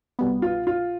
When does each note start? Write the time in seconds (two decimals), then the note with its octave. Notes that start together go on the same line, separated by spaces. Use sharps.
0.19 C2 B2 G3 B3
0.42 F4
0.67 F4